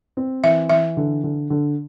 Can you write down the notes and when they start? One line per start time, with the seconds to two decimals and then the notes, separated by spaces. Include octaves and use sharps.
0.17 C4
0.44 E3 E5
0.69 E3 E5
0.97 D3
1.24 D3
1.50 D3